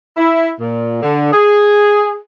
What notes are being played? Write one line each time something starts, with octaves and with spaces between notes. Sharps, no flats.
E4
A#2
D3
G#4